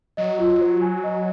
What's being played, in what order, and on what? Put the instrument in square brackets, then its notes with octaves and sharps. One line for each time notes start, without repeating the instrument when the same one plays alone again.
[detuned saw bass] F#3 [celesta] D#5
[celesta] F4
C5
G#5
D#5